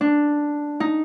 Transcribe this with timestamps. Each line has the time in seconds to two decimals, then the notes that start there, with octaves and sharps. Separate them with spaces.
0.01 D4
0.80 D#4